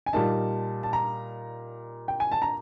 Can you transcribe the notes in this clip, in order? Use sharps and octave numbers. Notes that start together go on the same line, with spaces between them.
G#5
A#2 G3 A#3 D#4 A5
A5
A#5
G5
G#5
A5
A#5